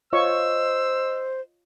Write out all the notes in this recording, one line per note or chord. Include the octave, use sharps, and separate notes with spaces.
F4 C5 C#5 D#5 C#6 E6